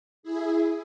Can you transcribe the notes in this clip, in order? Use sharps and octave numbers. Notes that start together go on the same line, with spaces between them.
E4 G#4